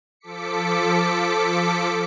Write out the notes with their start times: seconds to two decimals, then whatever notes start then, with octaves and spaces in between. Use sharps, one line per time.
0.20 F3 A4 D6 B6 C#7